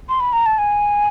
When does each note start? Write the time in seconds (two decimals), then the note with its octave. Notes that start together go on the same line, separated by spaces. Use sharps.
0.09 C6
0.20 B5
0.33 A#5
0.46 A5
0.58 G#5